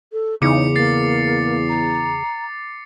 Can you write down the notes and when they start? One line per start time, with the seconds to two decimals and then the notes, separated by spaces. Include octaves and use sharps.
0.12 A4
0.42 E2 C#3 D#4 D6 C#7
0.76 A#3 A6 C7
1.68 A#5